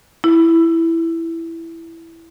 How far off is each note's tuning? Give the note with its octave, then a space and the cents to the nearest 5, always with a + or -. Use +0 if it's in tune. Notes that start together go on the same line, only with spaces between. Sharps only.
E4 +5